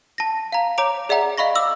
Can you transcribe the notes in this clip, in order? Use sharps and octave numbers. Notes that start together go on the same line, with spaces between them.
A5 A#6
F5 A#5
C#5 A#5 D6 D7 F7
G#4 D5 E5 F#5 A#5
D#5 F5 B5 C#6 A#6
D6 E6 F#7